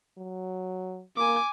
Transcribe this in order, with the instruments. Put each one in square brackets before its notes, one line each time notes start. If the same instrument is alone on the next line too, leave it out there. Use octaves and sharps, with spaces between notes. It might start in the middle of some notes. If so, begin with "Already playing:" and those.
[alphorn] F#3
[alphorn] A#3 [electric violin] G#5 D6